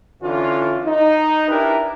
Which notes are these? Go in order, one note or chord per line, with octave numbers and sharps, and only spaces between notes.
D3 E3 C#4 F4
D#4
D4 E4 G4 A#4 B4